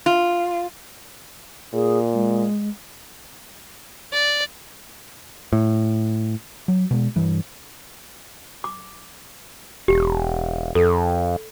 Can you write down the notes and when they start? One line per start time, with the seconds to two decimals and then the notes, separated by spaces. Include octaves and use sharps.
0.06 F4
1.74 A#2 G#4
2.13 G#3
4.12 D5
5.53 A2
6.68 F#3
6.91 B2 G#3
7.16 G2 E3
8.64 D6
9.88 E1 G4
10.75 F2 A4